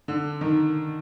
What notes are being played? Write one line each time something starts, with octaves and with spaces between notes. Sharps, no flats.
D3
D#3